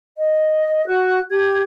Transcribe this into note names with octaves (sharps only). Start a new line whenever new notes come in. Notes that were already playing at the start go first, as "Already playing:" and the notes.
D#5
F#4 F#6
G4 G#6